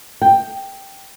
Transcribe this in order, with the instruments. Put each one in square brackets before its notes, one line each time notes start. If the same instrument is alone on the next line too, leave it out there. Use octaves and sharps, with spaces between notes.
[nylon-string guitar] G5